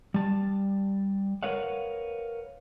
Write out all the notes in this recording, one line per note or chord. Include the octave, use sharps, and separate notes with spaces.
G3 A5
A#4 B4 C#5 F5 F#5